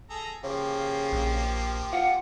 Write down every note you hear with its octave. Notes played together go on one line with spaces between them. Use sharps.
G#4 A4 A#5
C#3 F3 A#3 G4
A#1
F4 F#5